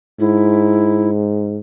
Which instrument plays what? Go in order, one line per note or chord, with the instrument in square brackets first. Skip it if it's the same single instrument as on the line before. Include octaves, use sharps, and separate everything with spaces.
[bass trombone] G#2 [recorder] E4